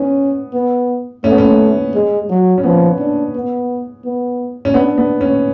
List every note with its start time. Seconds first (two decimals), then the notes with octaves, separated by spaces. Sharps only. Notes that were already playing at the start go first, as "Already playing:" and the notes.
Already playing: B3 C#4
0.53 B3
1.24 A3 C#4
1.31 B3
1.38 C#4
1.94 G#3
2.29 F#3
2.58 C#4
2.64 F3 B3
2.99 D4
3.35 B3
4.05 B3
4.65 C#4
4.74 B3 D4
4.98 B3
5.21 C#4